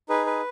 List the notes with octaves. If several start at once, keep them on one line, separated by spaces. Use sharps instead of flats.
D#4 G#4 B4
B4